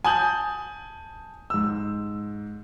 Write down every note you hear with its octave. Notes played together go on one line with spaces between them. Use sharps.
G#5 A5 D#6 G6 F#7
G#2 E6